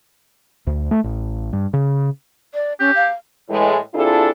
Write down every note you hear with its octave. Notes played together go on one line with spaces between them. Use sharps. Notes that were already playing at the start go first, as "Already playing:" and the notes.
D2
A3
A1
G2
C#3
D5
C#4 G4
F5
A2 E3 G#3
C3 D4 E4 F4 G#4 A4